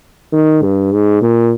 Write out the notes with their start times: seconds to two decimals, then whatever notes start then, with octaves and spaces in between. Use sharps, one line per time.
0.32 D#3
0.62 G2
0.92 G#2
1.22 A#2